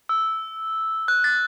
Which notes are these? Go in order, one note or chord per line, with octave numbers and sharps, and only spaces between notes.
E6
F#6
A6